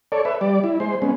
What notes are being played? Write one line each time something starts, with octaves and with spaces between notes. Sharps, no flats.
A4 C#5 D5
B4 E5
G3 D5
E4
G#3 C5
G#3 B3 C#4